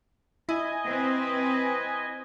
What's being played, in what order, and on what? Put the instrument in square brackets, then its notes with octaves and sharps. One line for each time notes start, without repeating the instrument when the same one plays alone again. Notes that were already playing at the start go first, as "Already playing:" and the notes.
[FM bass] E4 [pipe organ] D#5 G#5
[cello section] C4 B4